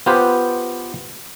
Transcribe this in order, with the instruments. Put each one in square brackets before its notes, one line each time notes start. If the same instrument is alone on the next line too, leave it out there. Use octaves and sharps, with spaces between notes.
[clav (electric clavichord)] B3 F4 G4 B4 C5